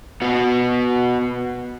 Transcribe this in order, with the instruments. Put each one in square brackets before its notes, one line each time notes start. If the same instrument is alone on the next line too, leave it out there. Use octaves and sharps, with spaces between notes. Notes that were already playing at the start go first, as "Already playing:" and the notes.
[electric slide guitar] B3 F#4